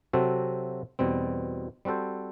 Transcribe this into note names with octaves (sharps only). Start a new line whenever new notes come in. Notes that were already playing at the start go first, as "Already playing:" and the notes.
C3 F#3 C4 F#4 A4
E2 B2 G3 C4
G3 C4 F#4 A4 C5